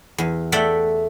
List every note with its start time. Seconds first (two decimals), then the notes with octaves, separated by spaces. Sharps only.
0.18 E2
0.52 A3 D5 E5 F#5 G5